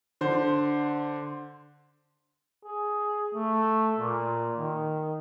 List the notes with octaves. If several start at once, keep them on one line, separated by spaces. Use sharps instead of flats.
D3 C5
G#4
A3
A#2
D#3